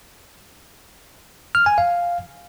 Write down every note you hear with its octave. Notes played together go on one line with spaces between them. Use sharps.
F6
G#5
F5